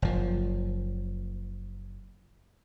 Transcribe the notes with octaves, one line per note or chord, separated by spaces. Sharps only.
F#1 F3